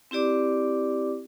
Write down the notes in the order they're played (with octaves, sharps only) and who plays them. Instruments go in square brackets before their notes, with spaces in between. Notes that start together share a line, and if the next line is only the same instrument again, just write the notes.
[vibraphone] C4 E4 G4 D5 D6